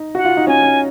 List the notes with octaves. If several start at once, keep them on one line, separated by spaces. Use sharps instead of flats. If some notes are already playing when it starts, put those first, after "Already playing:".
Already playing: D#4
F#4 F#5
F4
D#4
C#4 G#5
C#4